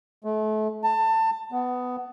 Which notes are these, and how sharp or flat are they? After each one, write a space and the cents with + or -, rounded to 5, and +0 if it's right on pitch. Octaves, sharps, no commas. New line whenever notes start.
A3 -35
A5 +25
B3 +15